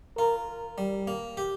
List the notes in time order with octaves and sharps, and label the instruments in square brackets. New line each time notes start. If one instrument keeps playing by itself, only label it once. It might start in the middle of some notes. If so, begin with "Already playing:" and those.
[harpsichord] F4 [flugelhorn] A#4
[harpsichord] G3
A#3
G4